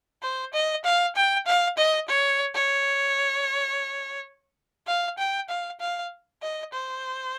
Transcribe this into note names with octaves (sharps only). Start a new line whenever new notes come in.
C5
D#5
F5
G5
F5
D#5
C#5
C#5
F5
G5
F5
F5
D#5
C5